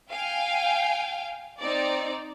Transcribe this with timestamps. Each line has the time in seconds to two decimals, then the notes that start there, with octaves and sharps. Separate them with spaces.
0.11 F5 G5 G#5
1.60 C4 D#4 D5